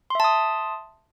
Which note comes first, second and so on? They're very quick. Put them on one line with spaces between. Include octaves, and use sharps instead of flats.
C6 E5 A5 D#6